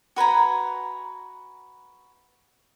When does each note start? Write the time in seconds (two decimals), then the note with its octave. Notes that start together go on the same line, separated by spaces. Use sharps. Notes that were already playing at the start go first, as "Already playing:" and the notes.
0.16 F#4 B4 G#5 A#5